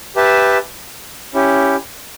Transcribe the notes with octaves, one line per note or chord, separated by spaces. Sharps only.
G4 B4 E5 A5
C#4 E4 G4